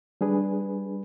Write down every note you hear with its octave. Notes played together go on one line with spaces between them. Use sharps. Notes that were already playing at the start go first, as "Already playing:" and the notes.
G3 D4 G#4 B4